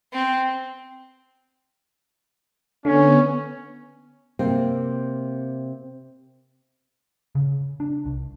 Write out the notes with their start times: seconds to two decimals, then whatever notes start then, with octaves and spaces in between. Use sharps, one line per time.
0.12 C4
2.85 D3 B3 C#4
4.39 C3 A#3 C4
7.35 C#3
7.80 D4
8.05 C2